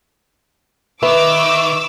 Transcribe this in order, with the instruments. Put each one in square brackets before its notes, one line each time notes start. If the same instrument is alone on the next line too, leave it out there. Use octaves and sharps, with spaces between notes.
[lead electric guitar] D#3 [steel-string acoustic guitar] B4 [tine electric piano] E5 [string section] D6 E6